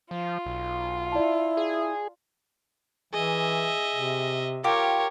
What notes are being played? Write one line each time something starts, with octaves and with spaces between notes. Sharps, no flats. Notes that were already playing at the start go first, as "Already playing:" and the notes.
F3 F4
B1
E4 D5 A5
G#4
E3 G#4 D#5 E5
C3
F4 G4 A#4 C#5